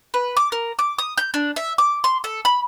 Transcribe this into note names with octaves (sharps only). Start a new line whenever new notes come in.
B4
D6
A#4
D6
D#6
G6
D4
E5
D6
C6
A4
B5